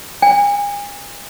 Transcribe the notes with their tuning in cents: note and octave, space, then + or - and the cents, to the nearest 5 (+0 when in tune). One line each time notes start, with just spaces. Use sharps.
G#5 -35